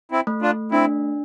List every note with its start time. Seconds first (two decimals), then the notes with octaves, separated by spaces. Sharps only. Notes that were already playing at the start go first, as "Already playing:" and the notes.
0.12 C4 E4
0.27 A3
0.42 D4 F4
0.72 C4 D4 E4